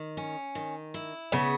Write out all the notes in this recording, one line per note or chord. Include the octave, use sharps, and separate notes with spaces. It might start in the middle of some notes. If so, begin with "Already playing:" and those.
Already playing: D#3
C#4
D#3
E4
C#3 B3